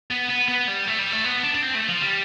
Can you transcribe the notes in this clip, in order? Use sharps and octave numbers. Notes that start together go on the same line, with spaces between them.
B3
B3
B3
G3
A3
G3
A3
B3
D4
D4
C4
A3
F3
G3